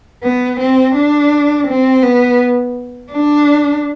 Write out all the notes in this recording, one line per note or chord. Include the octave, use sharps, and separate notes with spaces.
B3
C4
D4
C4
B3
D4